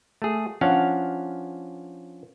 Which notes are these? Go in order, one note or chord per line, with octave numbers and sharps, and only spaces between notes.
A3 G#4
F3 C#4 D4 F5 F#5